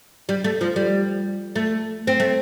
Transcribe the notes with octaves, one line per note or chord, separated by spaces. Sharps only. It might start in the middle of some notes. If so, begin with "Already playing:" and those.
G3
A3
F3
G3
A3
C4
A3